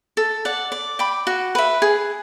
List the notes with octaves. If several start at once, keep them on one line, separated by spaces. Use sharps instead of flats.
A4
D5 F#5
D5
G5 B5 D6
F#4
B4 E5
G#4